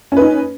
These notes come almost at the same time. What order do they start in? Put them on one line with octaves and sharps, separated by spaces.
C#4 B4 D#4